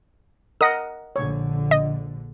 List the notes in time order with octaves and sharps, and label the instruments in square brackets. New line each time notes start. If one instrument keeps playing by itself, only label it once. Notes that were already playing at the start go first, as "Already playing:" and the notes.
[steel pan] A#4 D#5 F#5 [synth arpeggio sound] D#6 A#6
[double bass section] A#1 D3 [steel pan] C#5
[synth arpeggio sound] D#5